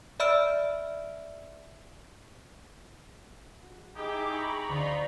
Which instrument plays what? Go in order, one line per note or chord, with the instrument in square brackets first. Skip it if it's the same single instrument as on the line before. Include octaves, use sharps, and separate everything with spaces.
[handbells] D5 E5 B5 E6 F6 D7
[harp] F#4
[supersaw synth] D#4 G#4 D6 [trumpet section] E4 G4
[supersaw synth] A#5 B5 C#6
[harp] D2 [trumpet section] D#4 F4